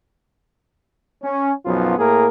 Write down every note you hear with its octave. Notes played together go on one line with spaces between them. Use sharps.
C#4
B1 F#2 F3 B3 F4
A2 A#3 G#4 A#4